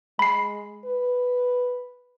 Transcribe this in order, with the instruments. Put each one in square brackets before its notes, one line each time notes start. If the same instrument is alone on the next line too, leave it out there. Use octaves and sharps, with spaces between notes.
[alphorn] G#3 [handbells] B5 C7
[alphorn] B4